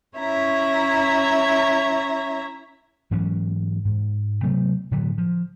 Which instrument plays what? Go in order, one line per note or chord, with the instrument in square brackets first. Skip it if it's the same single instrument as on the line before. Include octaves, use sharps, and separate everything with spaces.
[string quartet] C#4 E4 C#5 E5 A#5
[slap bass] G#2 E3 F#3 C#4
G#2
C3 F#3 A3 B3
A2 D3 E3 F#3
F3